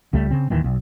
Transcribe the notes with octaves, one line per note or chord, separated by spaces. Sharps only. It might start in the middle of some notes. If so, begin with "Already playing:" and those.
C#2 G3 A3
C#3 C4
D1 D#2 D#3 E3
B1